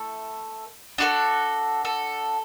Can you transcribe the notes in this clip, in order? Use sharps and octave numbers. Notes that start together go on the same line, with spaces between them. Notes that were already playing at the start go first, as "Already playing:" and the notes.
Already playing: A3 E4 A4
D4 F#4 A4
A4